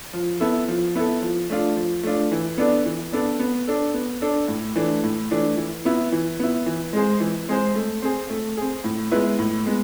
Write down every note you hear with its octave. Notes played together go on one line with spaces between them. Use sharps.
F3
B3 E4 A4
F3
B3 E4 A4
F3
A3 D4 F4
F3
A3 D4 F4
E3
B3 D4 A4 D5
E3
B3 D4 A4 D5
B3
D4 A4
B3
D4 A4
A2
E3 A3 D4
A2
E3 A3 D4
E3
B3 E4
E3
B3 E4
E3
G#3 C4 G#4 C5
E3
G#3 C4 G#4 C5
A3
C4 G#4
A3
C4 G#4
A2
G#3 B3 E4 B4
A2
G#3 B3